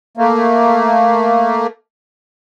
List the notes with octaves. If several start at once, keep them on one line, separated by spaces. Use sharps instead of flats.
A3 A#3